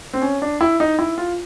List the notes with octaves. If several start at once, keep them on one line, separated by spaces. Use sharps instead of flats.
C4
C#4
D4
E4
D#4
E4
F4